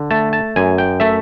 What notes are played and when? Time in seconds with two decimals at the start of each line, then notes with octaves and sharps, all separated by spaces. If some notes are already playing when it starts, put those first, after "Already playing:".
Already playing: D3
0.11 A3 A5
0.33 A5
0.56 F#2 G#5
0.78 G5
1.00 A3 E5